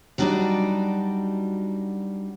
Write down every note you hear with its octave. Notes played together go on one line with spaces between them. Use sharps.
F#3 G3 D4 D#4 F#4 D5